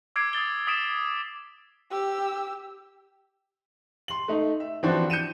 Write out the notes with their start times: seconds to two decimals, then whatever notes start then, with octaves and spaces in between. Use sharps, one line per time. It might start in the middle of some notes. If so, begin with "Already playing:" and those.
0.16 D6 E6 G#6 C7 D7
0.33 D#6 G#6 A6 G7
0.67 D#6 B6 D7 E7
1.91 G4 E6
4.08 C6 F#7
4.28 A3 D#4
4.60 E5
4.83 D3 E3 F3 C4 D4 F#4
5.10 G6 C#7 D#7 E7